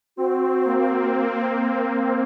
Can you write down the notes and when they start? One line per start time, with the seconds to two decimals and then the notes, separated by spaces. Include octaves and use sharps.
0.17 C4 F#4
0.65 A#3